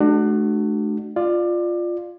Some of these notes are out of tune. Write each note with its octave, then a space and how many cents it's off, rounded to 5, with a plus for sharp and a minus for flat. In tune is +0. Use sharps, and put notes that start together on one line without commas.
A3 -35 D4 +30 F#4 +10
F4 +0 D5 +20